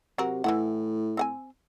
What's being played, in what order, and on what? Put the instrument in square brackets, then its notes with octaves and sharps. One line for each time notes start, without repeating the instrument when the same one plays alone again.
[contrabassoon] C3 [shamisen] F#3 F#4 A#4
[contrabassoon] A2 [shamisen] E3 E4 F#5
[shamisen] C4 F#5 G#5